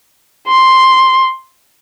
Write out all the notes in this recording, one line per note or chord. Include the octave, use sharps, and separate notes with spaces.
C6